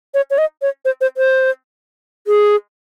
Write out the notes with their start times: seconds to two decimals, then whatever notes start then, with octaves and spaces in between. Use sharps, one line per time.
0.14 C#5
0.30 C#5
0.38 D#5
0.62 C#5
0.85 C5
1.01 C5
1.17 C5
2.27 G#4